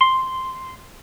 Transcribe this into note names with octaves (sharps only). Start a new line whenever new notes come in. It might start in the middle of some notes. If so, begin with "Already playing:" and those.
C6